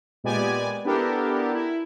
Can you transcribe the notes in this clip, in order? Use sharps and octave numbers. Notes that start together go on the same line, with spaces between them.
A#2 G#3 B3 G4 D5 G#5
B3 D4 E4 G4 A4 A#4
E4